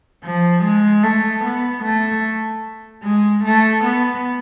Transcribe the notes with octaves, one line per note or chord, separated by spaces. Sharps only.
F3
G#3
A3
B3
A3
G#3
A3
B3